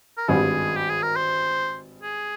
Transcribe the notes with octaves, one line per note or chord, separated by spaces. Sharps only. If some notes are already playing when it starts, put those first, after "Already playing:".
A#4
G#1 G2 G3 G#4
G4
G#4
A#4
C5
G#4